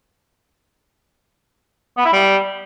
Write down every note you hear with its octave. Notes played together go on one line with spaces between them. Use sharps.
B3
E4
G3